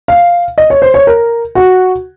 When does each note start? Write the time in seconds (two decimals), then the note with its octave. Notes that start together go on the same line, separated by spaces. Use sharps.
0.08 F5
0.58 D#5
0.70 C#5
0.82 C5
0.94 C#5
1.07 A#4
1.55 F#4